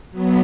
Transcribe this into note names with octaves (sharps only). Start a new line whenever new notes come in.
F#3 B3